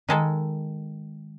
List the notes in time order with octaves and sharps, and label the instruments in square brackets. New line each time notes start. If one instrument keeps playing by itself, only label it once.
[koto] D#3 G#3 A4